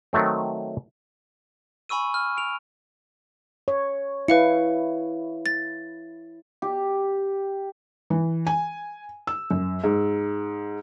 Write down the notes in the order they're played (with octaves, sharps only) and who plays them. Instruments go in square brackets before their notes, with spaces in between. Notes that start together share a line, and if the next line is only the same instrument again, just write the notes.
[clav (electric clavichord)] D#3 F#3 A3 C4
[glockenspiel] G#5 B5 C#6 E6 D#7
F6
D7 F7
[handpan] C#5
[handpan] E4 [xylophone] B4 F5 C#7
[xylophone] A6
[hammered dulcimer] G4
[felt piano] E3
G#5
E6
F#2
G#2